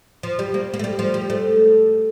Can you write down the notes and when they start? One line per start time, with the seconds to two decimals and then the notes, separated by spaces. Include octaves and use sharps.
0.23 F3
0.39 G3
0.54 A#3
0.74 A#3
0.79 A3
0.84 G3
0.99 F3
1.14 G3
1.30 A3